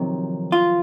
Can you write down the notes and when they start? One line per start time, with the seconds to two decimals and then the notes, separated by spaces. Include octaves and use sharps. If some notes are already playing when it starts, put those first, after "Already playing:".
Already playing: F2 C3 D#3 F#3
0.52 F4